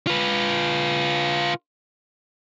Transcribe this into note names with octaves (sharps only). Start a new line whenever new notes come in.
F4 B4